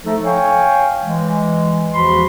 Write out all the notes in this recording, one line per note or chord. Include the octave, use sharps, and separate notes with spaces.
F3 A3 D#4 A4
C#5 F5 G5 G#5
E3 G#3
E2 F3 F#4 B5 C6